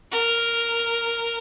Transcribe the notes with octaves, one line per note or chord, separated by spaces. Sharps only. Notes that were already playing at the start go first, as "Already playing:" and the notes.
A#4